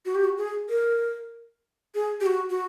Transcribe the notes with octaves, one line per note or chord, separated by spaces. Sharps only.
F#4
G4
F#4
G#4
A#4
G#4
G4
F#4
F#4